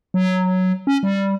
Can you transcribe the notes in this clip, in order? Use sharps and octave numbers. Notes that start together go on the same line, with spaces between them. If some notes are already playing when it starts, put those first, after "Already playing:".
F#3
C#4
G3